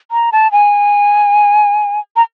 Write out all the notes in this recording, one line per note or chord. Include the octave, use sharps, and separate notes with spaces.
A#5
A5
G#5
A#5